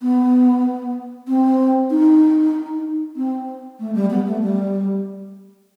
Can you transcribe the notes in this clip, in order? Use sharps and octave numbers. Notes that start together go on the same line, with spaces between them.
B3
C4
D#4
C4
A3
G3
B3
A3
G3